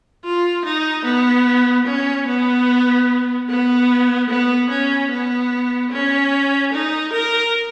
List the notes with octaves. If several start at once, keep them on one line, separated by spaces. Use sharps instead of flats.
F4
D#4
B3
C#4
B3
B3
B3
C#4
B3
C#4
D#4
A#4